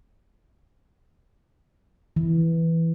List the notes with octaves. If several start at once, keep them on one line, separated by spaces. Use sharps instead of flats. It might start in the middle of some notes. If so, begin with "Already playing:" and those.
E3